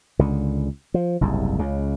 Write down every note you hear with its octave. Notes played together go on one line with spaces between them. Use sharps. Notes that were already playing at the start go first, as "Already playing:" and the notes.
C#2 D3
F3
F#1 C2 G#2
C#2 C#3